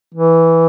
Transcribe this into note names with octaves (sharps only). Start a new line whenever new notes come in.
E3